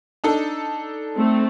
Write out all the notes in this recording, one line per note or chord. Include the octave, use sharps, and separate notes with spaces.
D4 D#4 A4
A3 C4